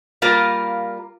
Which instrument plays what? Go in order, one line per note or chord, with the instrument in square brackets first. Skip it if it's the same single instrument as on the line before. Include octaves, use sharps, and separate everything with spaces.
[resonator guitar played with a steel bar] G3 A#3 F4 A#4